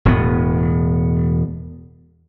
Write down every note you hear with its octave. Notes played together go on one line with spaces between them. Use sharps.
E1 E2 A2 B3